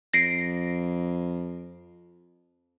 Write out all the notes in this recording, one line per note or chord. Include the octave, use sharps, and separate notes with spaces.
F2 A#6 C7 D7